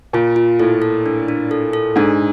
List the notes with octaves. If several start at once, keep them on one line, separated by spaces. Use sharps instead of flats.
A#2 F4
F4
A2 A4
A4
D4
D4
A4
A4
G#2 D4